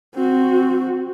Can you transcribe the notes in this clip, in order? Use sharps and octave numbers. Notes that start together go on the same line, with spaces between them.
C4 F#4